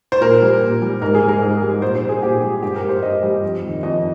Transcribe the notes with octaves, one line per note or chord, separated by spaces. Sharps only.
C5
A#2 A#4
G3
A#2
G3
G#2 A#4
G#4
G3
A#4
G#2 G#4
G3
A#2 C5
C5
G3
G#4
A#2 G4
G3
G2 G4
A#4
G3
C5
G2 D#5
G3
F2
G3
D#3
F2 D#5